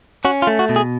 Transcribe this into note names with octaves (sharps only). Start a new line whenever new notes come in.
C#4 F#4
F4
A3
F#4
B2
G#4